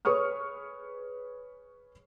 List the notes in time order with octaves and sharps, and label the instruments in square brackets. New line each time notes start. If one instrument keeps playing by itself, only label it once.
[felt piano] G#4 B4 C#5 C#6 D#6 F6